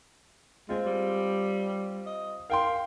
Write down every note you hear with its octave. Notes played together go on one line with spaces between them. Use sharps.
G#3 C4 F4
G3
D#5
A#4 F5 G5 C6